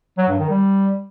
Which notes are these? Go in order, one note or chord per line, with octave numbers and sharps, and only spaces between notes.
F#3
G2
D#3
G3